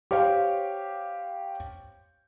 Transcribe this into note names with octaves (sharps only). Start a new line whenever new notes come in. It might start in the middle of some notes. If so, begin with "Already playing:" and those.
G4 C5 C#5 F5 G5